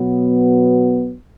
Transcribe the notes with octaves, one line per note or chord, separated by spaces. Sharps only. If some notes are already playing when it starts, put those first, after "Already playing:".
Already playing: B2 F#3 B3